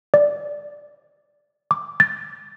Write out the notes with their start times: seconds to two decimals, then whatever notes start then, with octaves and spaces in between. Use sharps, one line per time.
0.14 D5
1.71 D6
2.00 A6